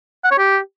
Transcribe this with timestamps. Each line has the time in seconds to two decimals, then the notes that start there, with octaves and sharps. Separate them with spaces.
0.24 F#5
0.31 C#5
0.39 G4